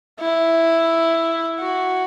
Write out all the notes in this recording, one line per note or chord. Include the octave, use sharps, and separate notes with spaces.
E4
F#4